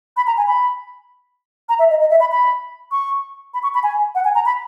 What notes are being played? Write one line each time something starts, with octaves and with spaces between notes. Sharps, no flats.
B5
A#5
G#5
B5
A#5
E5
D#5
D#5
E5
B5
B5
C#6
B5
C#6
B5
G#5
F#5
G#5
A#5
B5